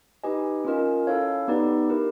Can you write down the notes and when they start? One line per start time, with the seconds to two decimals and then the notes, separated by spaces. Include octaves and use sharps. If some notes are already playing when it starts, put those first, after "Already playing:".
0.24 D#4 G4 B4 D#5 G#5
0.65 C#4 F4 A#4 D#5
1.07 C#4 E4 A4 C#5 F5
1.48 B3 D#4 G4 B4 D5
1.89 E4 G4 A#4